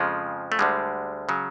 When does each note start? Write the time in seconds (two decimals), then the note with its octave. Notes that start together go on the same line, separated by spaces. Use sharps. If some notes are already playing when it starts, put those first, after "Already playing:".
Already playing: F2 C#3 F3 G#3
0.52 A3
0.59 D2 D3 G3 G#3
1.29 C#3 F#3